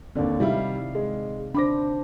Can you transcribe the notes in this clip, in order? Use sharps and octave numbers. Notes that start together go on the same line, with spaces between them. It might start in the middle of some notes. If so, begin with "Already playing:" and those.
D#2 D3 C4 D5
C3 G3 D#4 E4 F5
G#3
D4 C5 B5 D6 A#6